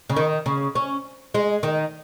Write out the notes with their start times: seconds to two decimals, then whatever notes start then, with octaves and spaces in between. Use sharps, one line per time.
0.10 C#3
0.17 D#3
0.46 C#3
0.75 C#4
1.34 G#3
1.63 D#3